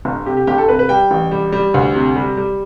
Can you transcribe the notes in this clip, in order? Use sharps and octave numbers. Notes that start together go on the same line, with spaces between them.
G1
C3 G4
G4
G1 G4
A4
C3 B4
B4
G3 G5
A1
G3
G3
D2
C3
G3
G3